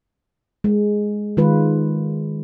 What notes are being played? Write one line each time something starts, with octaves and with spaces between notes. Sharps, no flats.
G#3
D#3 G#3 F4 B4